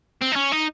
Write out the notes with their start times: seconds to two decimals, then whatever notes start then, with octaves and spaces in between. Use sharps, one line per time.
0.22 C4
0.32 D#4
0.36 C#4
0.52 D#4